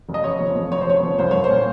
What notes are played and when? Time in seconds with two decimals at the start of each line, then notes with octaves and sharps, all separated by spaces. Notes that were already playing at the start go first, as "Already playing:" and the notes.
0.09 F1
0.14 D#5
0.24 C#3 C#5
0.40 F3
0.56 F2
0.71 F1 C#5
0.81 C5
0.87 F1 C#5
1.03 F3
1.19 C2 C5
1.31 C2 C#5
1.44 C5
1.51 A#2